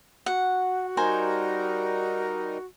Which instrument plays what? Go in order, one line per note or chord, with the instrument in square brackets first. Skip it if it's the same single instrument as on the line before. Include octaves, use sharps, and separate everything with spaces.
[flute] F#4 [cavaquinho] F#5
[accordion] G3 D#4 A#4 [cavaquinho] C5 G#5 A#5